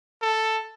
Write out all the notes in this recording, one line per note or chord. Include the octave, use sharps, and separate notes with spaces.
A4